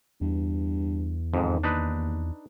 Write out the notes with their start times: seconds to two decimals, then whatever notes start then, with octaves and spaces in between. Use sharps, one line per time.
0.21 E2 G2
1.34 F2 G#2 D#3
1.63 D#2 D4 D#4 B4